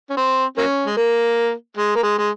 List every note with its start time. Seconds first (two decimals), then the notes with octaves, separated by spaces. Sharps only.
0.09 C#4
0.17 C4
0.57 F#3 A#3 C#4
0.86 G#3
0.97 A#3
1.77 G#3
1.96 A#3
2.03 G#3
2.18 G#3